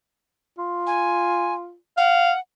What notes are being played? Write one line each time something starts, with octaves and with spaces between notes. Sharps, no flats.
F4
G#5
F5 F#5